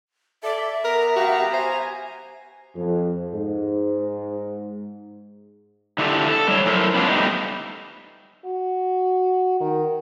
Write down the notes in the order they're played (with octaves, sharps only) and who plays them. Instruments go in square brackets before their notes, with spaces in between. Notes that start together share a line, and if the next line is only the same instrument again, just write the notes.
[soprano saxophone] A4 [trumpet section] D5 [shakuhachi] E5
[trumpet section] B3 A#5 [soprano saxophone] A#4
[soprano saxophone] F#4 [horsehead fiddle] G4 F5
[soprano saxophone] C5 [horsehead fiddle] G#5
[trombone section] F2
G#2
[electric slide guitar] D3 E4 F4 G4 A4
A4
G3 C#5
F#3 E4 A4 A#4 C5 E5
B3 C#4 D4 F4
G3 A3 B3 D#4
[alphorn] F#4
D#3